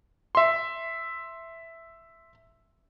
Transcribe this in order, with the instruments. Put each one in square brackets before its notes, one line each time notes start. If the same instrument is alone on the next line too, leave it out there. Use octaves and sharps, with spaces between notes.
[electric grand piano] E5 C6